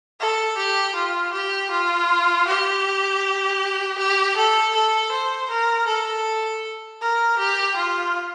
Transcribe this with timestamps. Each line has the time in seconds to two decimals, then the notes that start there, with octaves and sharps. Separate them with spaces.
0.20 A4
0.57 G4
0.95 F4
1.32 G4
1.71 F4
2.47 G4
3.98 G4
4.36 A4
4.74 A4
5.12 C5
5.50 A#4
5.87 A4
7.02 A#4
7.39 G4
7.76 F4